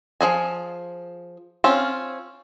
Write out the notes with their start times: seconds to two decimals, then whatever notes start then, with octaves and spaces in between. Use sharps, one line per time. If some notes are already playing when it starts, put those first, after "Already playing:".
0.21 F3 F#3 G#4 G#5
1.64 C4 C#4 F4